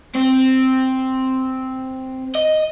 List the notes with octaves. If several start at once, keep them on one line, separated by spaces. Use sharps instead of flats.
C4
D#5